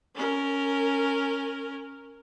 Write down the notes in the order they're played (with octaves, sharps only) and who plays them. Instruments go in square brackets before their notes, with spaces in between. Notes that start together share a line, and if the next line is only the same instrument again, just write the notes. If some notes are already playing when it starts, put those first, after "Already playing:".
[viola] C#4 A#4